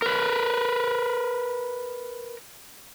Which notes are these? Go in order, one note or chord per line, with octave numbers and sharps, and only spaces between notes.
A#4 B4